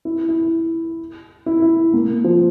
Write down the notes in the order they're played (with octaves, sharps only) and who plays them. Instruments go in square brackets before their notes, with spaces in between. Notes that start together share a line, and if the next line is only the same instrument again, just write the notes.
[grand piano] E4
E4
E4
E4
A#3
F3